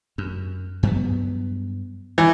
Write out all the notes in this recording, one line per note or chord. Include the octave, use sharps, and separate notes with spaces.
F#2
G2 F#3 B3
E3